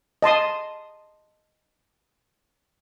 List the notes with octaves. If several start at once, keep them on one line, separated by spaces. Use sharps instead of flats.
D#5 A5 C6 D#6